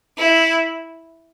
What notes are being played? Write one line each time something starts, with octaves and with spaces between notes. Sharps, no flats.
E4